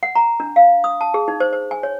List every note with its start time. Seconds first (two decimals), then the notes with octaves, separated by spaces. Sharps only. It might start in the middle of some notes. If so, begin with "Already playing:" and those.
0.03 F#5
0.15 A#5
0.40 D4
0.56 F5
0.84 D#6
1.01 A5
1.14 G#4
1.28 D#4
1.40 C5
1.53 C5
1.71 G#5
1.83 C#5